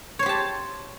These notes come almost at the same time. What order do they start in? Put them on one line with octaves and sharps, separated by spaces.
C#5 C5 G4 A5